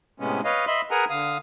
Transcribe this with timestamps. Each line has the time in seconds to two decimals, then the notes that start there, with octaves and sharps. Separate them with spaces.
0.20 A2 C3 G#3 B3 C#4
0.44 B4 C#5 D#5 F5
0.67 D#5 E5 B5 C6
0.91 G#4 A#4 B4 F#5 G#5 A#5
1.10 D3 F5 D#6